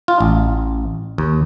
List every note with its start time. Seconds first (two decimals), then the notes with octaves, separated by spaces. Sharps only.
0.08 F4
0.21 A1
1.18 D#2